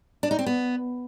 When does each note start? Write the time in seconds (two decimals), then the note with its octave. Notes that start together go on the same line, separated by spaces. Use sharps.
0.23 D4
0.31 D#4
0.39 C4
0.46 B3